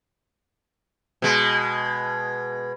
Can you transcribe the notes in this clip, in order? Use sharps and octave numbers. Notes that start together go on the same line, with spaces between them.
B2 G#3